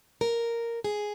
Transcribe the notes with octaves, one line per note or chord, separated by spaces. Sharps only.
A#4
G#4